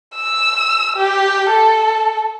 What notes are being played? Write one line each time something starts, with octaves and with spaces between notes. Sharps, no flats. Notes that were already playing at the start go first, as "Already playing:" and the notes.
E6
G4
A4